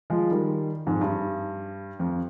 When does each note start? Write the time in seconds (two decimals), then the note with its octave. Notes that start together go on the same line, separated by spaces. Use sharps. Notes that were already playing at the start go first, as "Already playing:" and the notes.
0.10 F3 G#3
0.31 D#3 G3
0.87 F2 G#2
1.01 G2
1.99 F2